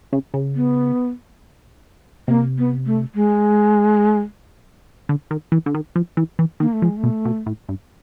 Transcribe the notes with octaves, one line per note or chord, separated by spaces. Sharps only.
C#3
C#3
B3
C3 A#3
B3
A3
G#3
D3
D#3
E3
D3
D#3
F3
E3
E3
D#3 A#3
A3
F3
G#3
A3
B2
B2
A2
G2